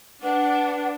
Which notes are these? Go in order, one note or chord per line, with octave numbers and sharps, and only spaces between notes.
D4 B4 F#5